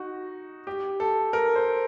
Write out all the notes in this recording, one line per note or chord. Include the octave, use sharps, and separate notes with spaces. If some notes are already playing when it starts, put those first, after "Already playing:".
Already playing: D#4 F#4
G4
A4
A#4
C5